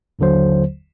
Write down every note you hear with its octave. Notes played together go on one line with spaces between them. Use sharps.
G1 D#2 D3 F#3 C5